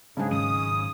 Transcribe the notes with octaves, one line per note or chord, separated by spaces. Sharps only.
G#2 C#3 G#3 D4 G#4
G#2 D#3 F#3 C#4 D#6